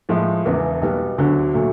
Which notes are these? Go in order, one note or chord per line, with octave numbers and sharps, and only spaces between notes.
A2 F3 G#3
E1 E2 C#3 E3
B1 B2 G3 B3
D2 D3 F#3
A#2 F#3 A3